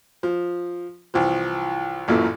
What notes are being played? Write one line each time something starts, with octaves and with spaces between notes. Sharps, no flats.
F3
C2 E3 F3
A1 F#2 A#2 E3 A3